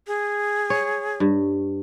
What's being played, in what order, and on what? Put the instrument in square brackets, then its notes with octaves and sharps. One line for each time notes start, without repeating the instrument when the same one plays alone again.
[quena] G#4
[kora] C#5
G2